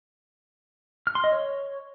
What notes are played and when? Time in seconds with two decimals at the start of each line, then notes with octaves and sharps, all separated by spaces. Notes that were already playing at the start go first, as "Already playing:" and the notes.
1.07 F6
1.15 C6
1.24 D#5
1.32 C#5